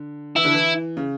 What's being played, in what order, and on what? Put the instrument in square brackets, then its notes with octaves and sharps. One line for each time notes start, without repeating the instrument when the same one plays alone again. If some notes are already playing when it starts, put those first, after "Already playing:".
Already playing: [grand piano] D3
[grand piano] E3 [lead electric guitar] E4
[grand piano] D3
E3
C#3